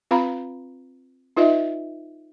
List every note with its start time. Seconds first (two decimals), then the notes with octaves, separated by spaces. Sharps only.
0.11 C4 F4 B4 F5 A#5 B5
1.37 D#4 F4 B4 D#5 E5